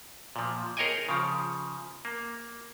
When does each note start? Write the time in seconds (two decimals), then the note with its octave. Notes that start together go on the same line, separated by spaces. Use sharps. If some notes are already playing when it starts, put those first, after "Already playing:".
0.36 A#2 F3
0.77 G#4 A#4 C#5 D#5 G5 G#5
1.09 C#3 F3
2.05 A#3